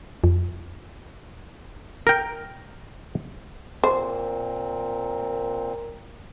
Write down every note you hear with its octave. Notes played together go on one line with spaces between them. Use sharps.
F2
A#4 G5
A#2 C4 A#4 C5